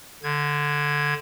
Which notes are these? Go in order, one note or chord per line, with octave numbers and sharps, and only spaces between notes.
D3 G#6